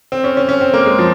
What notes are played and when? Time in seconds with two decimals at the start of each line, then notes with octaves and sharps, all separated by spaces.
0.12 C4
0.24 C#4
0.37 C#4
0.49 C#4
0.61 C4
0.73 A#3
0.86 G#3
0.99 F3